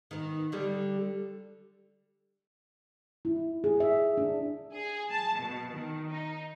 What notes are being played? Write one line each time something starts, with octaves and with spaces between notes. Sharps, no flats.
D#3 B3
D3 G3
E4
G#4
E5
D4
G#4
A5
B2
D#3
D#4